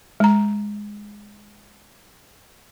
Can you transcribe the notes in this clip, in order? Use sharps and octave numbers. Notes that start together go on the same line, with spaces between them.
G#3 A#5